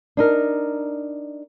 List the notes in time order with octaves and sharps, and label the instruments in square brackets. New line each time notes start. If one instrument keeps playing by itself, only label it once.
[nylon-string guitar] D4 D#4 A#4